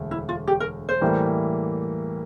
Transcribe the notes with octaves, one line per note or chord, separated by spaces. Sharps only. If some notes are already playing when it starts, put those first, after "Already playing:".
Already playing: E1 D2
E4
F4
G4
A#4
C5
A2 E3 G3 A#3